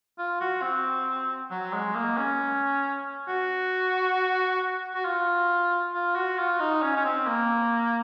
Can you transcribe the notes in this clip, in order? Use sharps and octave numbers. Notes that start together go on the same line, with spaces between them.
F4
F#4
C4
F#3
G#3
A#3
C#4
F#4
F#4
F4
F4
F#4
F4
D#4
C#4
C#4
C4
A#3